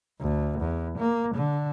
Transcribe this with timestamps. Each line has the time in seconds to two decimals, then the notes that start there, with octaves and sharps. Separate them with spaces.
0.20 D2
0.60 E2
0.98 A#3
1.35 D3